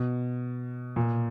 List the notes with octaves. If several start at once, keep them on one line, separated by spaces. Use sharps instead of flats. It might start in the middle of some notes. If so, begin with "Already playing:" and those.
Already playing: B2
A#2